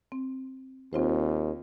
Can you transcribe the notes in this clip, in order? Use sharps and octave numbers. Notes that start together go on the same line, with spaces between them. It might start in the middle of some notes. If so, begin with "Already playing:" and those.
C4
D#2 C4 F4 C5